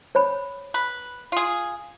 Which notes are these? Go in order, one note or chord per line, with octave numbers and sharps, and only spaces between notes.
C5 C#5 B5
B4
F4 G#4